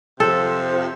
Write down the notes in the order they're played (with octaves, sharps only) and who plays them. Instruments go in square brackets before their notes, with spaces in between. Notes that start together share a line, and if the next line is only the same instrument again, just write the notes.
[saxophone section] F2 C3 F3 [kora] A4